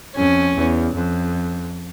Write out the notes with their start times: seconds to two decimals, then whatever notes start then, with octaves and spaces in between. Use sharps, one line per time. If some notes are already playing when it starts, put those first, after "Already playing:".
0.16 F2 C#4
0.55 E2
0.94 F2